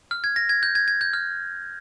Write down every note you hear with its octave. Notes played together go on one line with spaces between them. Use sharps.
F6
G#6
A#6
G#6
G6
G#6
G#6
G6
F6